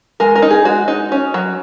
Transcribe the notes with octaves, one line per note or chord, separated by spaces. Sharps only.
G#3 A#4
A#4
D#4
G#4
G#3 F#4
D#4
C#4
F#3